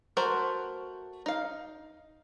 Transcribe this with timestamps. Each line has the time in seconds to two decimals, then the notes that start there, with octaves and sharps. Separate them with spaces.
0.17 A3 F#4 A#4 C5
1.26 D#4 F5